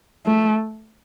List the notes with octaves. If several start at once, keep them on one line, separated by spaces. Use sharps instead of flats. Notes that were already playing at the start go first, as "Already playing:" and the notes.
A3